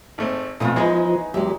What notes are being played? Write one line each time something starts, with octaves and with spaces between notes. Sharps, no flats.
G#1 A3 C4
F2 B2 E3 F3 A3 F4 D#6
E3 F3 G#3 B3 D#4 G#4 C#5 D#5
E2 F#3 G#3 G4 E5